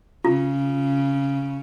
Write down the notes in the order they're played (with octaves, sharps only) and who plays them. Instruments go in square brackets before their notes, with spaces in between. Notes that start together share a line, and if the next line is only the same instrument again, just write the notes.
[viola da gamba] C#3 [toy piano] F4